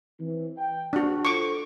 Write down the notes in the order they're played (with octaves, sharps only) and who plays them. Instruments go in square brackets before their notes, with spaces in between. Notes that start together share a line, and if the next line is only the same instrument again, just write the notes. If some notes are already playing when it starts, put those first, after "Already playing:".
[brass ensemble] E3 C4
G5
[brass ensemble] A#1 [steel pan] D4 F#4
[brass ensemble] F4 A4 C5 [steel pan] C#6 D6